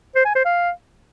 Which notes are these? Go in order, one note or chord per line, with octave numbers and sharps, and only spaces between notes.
C5
G#5
C5
F5